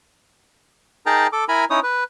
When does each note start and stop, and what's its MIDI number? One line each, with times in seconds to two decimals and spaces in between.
1.06 1.27 63
1.06 1.27 68
1.06 1.27 70
1.06 1.27 79
1.06 1.27 81
1.06 1.27 82
1.33 1.44 69
1.33 1.44 86
1.49 1.65 64
1.49 1.65 70
1.49 1.65 80
1.49 1.65 82
1.49 1.65 83
1.70 1.80 61
1.70 1.80 63
1.70 1.80 64
1.70 1.80 73
1.70 1.80 87
1.83 2.04 71